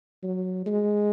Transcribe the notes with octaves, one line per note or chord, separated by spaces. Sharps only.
F#3
G#3